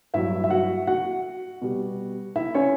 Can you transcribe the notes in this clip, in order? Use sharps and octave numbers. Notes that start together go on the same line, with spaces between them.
G2 F#3 E4 E5
E5
F#4 F#5
F#4 F#5
B2 G3
E4 E5
C#4 C#5